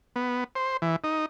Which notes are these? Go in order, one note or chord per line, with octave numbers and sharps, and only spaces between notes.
B3
C5
E3
D#4